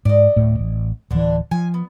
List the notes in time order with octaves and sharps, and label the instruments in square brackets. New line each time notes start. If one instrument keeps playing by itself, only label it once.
[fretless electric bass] G#2 [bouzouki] D5 D#5
[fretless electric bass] D1 A2 A3
A1
[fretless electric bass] D1 E3 [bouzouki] D3 D4
[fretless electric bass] F3 [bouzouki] G#5
[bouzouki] B3